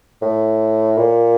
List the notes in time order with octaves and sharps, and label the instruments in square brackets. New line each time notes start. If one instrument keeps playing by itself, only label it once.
[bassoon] A2
A#2